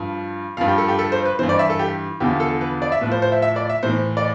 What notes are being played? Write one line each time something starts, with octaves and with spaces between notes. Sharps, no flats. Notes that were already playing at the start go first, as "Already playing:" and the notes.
Already playing: G2 F3
G2 F3 F5
G4
A4
G4
A4
C5
B4
G2 E3 C5
D5
E5
A4
G4
E2 D3 F3 G4
A4
B4
D5
E5
A2 F3 B4
C5
C5
E5
E5
D5
E5
A2 E3 C5
D5